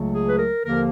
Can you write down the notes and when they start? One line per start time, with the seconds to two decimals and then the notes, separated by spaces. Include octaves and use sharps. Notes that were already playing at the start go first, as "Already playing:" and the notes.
Already playing: C#2 C#3 F#3 A3
0.13 G#4
0.29 B4
0.38 A#4
0.65 D#2 D3 F3 A#3 A#4